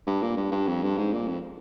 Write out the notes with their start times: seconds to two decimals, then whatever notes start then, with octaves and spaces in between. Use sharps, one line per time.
0.07 G2
0.22 A#2
0.37 G2
0.52 G2
0.67 F2
0.83 G2
0.97 G#2
1.13 A#2
1.28 F2